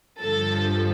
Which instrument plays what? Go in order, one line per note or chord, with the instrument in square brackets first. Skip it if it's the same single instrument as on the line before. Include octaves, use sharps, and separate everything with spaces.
[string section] G2 D3 F3 A4